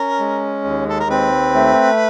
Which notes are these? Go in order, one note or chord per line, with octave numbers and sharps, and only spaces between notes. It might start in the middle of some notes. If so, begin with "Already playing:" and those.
Already playing: C#4 A#4
G#3
D#2
A4
A#4
C4 B4
A3